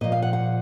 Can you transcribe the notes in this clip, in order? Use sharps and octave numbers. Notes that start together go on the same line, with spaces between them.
A#2 F3 D#5
F5
F#5
F#5